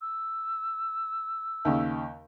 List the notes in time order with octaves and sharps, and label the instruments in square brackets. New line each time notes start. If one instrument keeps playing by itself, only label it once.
[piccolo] E6
[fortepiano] D#2 C#3